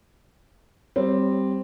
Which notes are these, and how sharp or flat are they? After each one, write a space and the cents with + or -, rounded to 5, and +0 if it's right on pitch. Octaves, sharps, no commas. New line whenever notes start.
G3 +0 C4 +0